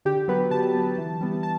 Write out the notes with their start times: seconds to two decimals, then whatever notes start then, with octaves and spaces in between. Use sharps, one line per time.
0.05 D3 G4
0.28 F#3 B3 B4
0.51 D3 A5
0.74 F#3 B3
0.98 E3
1.21 G3 B3
1.43 A5